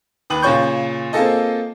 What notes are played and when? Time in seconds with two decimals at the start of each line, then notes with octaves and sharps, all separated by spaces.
0.30 D#2 B4 D#6 F#7
0.42 A#2 C#3 F4 C#5 C#6 G6
1.13 A#3 C4 F4 G#4 A4 D#5